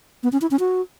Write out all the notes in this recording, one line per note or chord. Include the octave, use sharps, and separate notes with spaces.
B3
C#4
E4
C#4
F#4